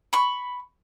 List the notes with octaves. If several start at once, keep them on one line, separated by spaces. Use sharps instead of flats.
B5 C#6